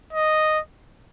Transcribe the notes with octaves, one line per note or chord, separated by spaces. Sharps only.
D#5